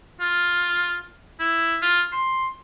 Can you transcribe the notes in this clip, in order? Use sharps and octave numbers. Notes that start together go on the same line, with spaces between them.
F4
E4
F4
C6